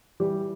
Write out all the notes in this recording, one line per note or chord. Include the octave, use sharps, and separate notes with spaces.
E3 G3 G4